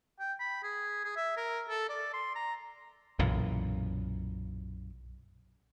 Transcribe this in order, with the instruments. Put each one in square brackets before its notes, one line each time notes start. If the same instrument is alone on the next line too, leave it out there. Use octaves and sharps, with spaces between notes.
[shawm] G5
B5
G#4
G#4
E5
A#4
A4
D5
C6
A#5
[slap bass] B1 F#2 A#2 E3